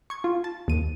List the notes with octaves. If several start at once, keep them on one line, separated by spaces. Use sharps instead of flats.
C#6 G#6
F4
A5
D#2 D#7